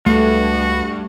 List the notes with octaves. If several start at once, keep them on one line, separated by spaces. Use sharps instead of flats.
C#2 G2 A3 F#4